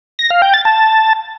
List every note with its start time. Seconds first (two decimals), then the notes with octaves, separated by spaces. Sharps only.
0.19 A#6
0.30 F5
0.42 G5
0.54 A6
0.65 A5